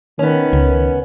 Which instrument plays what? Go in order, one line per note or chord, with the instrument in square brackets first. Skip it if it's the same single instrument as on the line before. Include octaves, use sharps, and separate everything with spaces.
[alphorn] D#3 [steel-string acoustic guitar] B3 C#4
[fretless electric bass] C#2